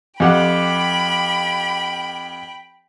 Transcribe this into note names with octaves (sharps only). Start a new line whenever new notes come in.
F2 G4 F#5 G5 B5